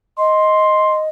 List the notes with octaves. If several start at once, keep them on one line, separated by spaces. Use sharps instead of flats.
D#5 C6